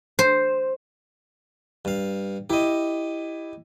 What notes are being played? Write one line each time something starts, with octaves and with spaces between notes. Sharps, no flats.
C5
G2 F5
E4 G4 D#5